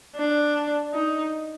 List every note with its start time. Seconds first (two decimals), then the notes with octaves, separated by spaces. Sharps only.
0.16 D4
0.93 D#4